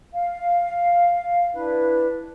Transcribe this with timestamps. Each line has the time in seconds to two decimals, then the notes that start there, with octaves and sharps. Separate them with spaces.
0.13 F5
1.54 D4 E4 B4